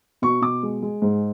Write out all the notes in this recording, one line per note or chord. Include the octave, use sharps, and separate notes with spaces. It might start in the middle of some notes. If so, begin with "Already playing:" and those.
B2 C#6
B2 D6
G#3
G#3
G#2